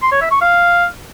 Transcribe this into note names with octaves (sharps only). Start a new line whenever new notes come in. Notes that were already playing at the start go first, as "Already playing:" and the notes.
C6
C#5
E5
C#6
F5